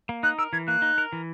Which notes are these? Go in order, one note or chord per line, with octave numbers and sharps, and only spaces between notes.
A#3
D#4 F#6
A#4 E6
E3 G#6
A#3 F#6
D#4
A#4
E3